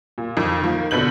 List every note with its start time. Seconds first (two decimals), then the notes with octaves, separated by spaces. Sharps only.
0.18 A#2
0.37 F2 D#3
0.62 D#3 F3 A#3
0.91 B2 D3 B4 G6 F#7